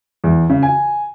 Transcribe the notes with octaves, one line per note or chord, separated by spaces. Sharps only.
E2
C#3
G#5